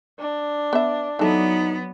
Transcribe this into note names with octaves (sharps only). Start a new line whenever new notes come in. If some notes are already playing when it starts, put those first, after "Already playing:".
D4
B3 E5
E3 F#3 B3 D#4 A4